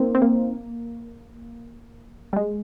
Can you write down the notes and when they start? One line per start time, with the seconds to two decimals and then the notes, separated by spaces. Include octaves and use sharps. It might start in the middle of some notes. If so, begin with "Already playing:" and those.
Already playing: A#3 C4 D#4
0.15 C4
0.22 A#3
2.33 G3
2.36 G#3